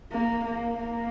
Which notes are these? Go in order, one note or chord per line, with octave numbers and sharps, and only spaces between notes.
A#3
A#3
A#3